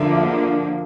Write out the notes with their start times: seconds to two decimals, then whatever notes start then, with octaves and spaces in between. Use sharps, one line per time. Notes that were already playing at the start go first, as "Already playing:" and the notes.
Already playing: D3 F3 A#3 E5
0.13 E5